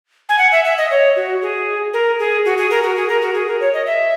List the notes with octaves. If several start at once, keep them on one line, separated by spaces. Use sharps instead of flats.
G#5
F#5
E5
E5
D#5
C#5
F#4
G#4
A#4
G#4
F#4
G#4
A#4
F#4
G#4
A#4
F#4
G#4
A#4
C#5
D#5
E5